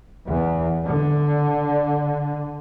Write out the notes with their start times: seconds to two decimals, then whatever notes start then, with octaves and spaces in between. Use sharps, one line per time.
0.25 E2
0.85 D3